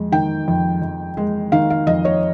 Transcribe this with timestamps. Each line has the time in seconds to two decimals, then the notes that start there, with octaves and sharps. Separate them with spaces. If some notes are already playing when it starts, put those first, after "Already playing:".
Already playing: F2 G#3
0.12 D#3 G5
0.48 F2
0.82 F2
1.17 G#3
1.52 D#3 F5
1.70 F5
1.87 F2 D#5
2.05 C#5